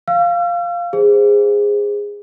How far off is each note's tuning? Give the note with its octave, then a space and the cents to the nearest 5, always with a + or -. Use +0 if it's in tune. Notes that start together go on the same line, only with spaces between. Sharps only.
F5 +0 E6 +45
G#4 -20 C5 +5